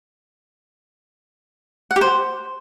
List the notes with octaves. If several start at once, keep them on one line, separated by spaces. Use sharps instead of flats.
F#5
G4
C5